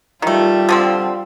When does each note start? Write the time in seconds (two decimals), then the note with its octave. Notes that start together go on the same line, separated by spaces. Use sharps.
0.22 D#3 G3 A3 F4
0.69 D3 F3 C4